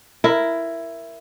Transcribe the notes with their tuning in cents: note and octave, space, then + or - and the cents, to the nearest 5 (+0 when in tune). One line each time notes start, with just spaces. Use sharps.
E4 +10 A#4 +0